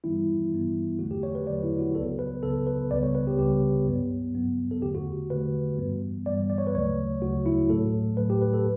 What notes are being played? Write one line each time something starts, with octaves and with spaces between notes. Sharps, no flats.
G2 E3 G3 B3 E4
G2 E3 G3 B3
E2 D3 F#3 A3 F#4
G4
C#5
B4
E2 D3 F#3 A3 D5
E4
F#4
C#2 C#3 F#3 B3 A4
B4
C#2 C#3 F#3 B3 A4
B4
C#2 C#3 G3 B3 D5
C#5
B4
G4
C#2 C#3 G3 B3 G4
G2 F#3 B3
G2 F#3 B3
A4
E2 D3 A3 G4
F#4
E2 D3 A3 B4
G2 E3 G3 B3
G2 E3 G3 B3 D5
D5
C#5
B4
D2 C#3 F#3 A3 C#5
D2 C#3 F#3 A3 F#4
E4
A2 F#3 A3 A4
A2 F#3 A3 B4
G4
B4
A4